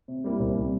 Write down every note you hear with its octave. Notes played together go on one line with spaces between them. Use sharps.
C3
G3 A#3 E4
C2
C3 G3